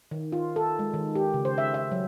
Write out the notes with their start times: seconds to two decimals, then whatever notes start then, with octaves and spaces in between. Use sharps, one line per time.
0.11 D#3
0.32 F4
0.56 A4
0.79 G#3
0.94 D#3
1.15 G4
1.34 C#3
1.45 C5
1.58 E5
1.74 E5
1.92 F#3